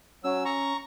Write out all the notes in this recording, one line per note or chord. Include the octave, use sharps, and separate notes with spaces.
F#3 C#4 E6
A#5 C#6